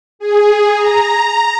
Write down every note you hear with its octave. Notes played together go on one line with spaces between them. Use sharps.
G#4
A#5